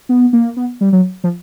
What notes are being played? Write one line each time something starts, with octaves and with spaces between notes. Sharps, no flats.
B3
A#3
B3
G3
F#3
F3